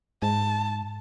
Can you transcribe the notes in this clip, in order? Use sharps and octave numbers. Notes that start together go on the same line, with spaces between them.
G#2 A5